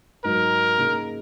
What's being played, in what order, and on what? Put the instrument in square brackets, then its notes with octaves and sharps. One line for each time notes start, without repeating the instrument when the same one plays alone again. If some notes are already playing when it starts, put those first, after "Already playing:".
[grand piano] G#2 F#3 D#4 [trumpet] A#4
[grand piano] C#3 A#3 D#4 G#4